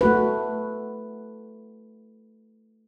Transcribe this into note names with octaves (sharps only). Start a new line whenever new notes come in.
A3 F#4 B4